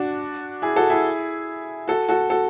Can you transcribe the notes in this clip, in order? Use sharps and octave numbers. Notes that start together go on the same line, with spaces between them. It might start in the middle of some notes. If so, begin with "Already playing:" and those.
Already playing: D4 F#4
E4 G#4
F#4 A4
E4 G#4
F#4 A4
F#4 A4
F#4 A4